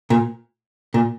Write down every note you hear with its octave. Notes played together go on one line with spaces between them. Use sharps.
A#2
A#2